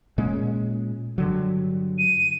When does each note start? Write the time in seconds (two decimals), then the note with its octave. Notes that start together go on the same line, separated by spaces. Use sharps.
0.18 A#2 G#3 C#4
1.18 G2 D3 F#3
1.98 D#7